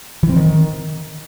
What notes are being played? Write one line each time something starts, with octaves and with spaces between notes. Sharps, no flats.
E3
C4
D#3